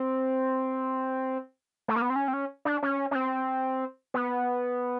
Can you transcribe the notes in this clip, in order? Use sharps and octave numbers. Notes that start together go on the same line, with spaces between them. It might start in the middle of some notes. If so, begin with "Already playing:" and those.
Already playing: C4
A3
A#3
B3
C4
C#4
C4
C#4
D4
C#4
C#4
C4
B3